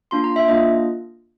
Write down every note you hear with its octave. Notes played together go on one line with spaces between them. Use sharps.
A#3 D4 F4 C6
A#5
E5
A#3 D4 F4 D#5